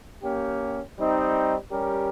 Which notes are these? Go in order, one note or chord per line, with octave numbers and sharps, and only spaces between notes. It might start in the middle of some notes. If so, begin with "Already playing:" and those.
A#3 C#4 G4
G3 C4 D#4
G3 C#4 G4 A#4